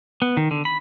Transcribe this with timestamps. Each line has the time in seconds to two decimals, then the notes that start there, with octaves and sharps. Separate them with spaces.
0.22 B3
0.37 D#3
0.51 D3
0.65 B5